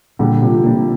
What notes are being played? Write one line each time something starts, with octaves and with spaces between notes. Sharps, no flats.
A#2 D3 G3
C3 F3
C3 F3 A#3 D4